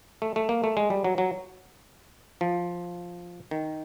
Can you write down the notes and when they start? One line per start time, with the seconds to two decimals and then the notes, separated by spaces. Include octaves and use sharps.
0.22 A3
0.36 A3
0.49 A#3
0.64 A3
0.77 G#3
0.90 G3
1.04 F#3
1.18 F#3
2.41 F3
3.51 D#3